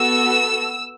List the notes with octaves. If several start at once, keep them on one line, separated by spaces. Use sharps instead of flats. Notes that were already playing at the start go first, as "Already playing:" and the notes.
Already playing: B3 F#4 A4 E6